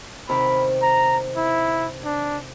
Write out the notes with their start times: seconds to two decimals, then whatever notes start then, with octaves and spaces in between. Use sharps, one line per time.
0.29 C3 D#3 B5
0.82 A#5
1.36 E4
2.04 D4